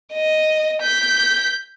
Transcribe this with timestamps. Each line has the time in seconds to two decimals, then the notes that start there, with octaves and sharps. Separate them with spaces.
0.14 D#5
0.82 G6 B6